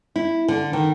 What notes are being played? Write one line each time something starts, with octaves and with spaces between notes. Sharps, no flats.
E4
D3
D#3